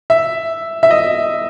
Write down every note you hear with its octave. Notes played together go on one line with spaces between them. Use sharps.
E5
E5
D#5